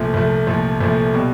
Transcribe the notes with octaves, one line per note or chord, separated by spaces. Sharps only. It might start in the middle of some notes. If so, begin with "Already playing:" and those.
Already playing: C2 A#2 F3 A3
C2 A#2 F3 A3
C2 A#2 F3 A3
C2 A#2 F3 A3
B2 G3